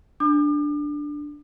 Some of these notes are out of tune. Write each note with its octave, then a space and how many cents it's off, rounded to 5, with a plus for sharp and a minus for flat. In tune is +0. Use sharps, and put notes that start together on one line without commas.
D4 +0 D6 +40